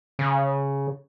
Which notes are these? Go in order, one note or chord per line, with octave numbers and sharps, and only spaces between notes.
C#3